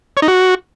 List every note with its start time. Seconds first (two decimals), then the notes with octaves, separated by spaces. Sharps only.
0.17 C#5
0.22 D#4
0.28 F#4